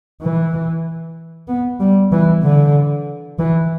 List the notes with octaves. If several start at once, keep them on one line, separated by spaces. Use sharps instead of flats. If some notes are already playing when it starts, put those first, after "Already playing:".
E3
B3
G3
E3
D3
E3